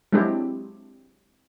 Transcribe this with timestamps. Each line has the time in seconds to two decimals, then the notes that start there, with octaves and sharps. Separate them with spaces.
0.12 F#3 G#3 C4 D4 E4 G4